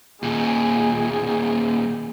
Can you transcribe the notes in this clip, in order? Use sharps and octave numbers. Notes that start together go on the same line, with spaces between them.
D#2 A#2 G#4